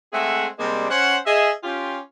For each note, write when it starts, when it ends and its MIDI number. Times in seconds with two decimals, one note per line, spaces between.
0.12 0.46 56
0.12 0.46 57
0.12 0.46 60
0.12 0.46 68
0.12 0.46 76
0.12 0.46 78
0.58 0.86 48
0.58 0.86 55
0.58 0.86 56
0.58 0.86 58
0.58 0.86 60
0.58 0.86 62
0.89 1.16 61
0.89 1.16 72
0.89 1.16 78
1.25 1.50 68
1.25 1.50 75
1.25 1.50 76
1.63 1.98 61
1.63 1.98 65
1.63 1.98 67